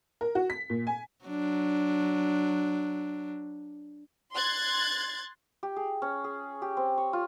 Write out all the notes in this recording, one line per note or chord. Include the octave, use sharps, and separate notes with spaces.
A#4
F#4
B6
A#2
G#5
F#3 D4
C6 F#6 G#6 A6
G4
G#4
C#4
G#4
G4
C4
C#5
F4